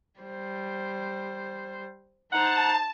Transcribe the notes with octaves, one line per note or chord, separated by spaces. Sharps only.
G3 C5
D#4 C5 F#5 A5 A#5